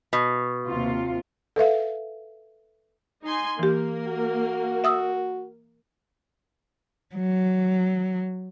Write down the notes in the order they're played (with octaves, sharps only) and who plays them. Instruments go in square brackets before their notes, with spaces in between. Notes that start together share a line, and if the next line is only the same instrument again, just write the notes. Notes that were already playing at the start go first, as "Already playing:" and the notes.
[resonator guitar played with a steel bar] B2
[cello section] D#2 C3 F4
[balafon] A4 B4 E5 F5
[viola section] D#4 G#5 C6
[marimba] E3 G4 [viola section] A#3 A#4
[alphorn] F#4
[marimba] E5 D#6 E6
[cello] F#3